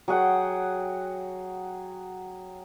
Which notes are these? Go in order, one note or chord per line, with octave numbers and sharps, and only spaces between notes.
F#3 G#4 F#5 G5